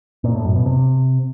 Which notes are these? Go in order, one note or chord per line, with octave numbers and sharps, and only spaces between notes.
A#2
A2
F#2
B2
C3